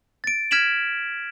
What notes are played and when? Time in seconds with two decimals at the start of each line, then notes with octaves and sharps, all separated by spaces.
0.24 A6 D7
0.51 F6 G#6 B6 D7 E7 F#7